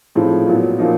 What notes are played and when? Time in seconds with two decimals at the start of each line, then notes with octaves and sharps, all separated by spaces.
0.15 A2 F3 G#3 C4 D#4
0.47 A#2 F#3 B3
0.79 A#2 F3 A#3 D#4